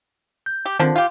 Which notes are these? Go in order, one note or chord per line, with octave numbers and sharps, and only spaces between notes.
G6
G4
D3 D#3 F3 C4
F4 G4 F5